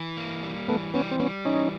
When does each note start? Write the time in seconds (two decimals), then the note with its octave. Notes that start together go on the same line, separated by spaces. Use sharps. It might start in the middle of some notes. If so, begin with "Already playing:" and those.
Already playing: E3
0.17 A#3
0.43 G3
0.68 E3 A3 B3
0.94 G3 B3 C#4
1.11 C4
1.19 G3 B3 C#4
1.45 E3 C#4 D#4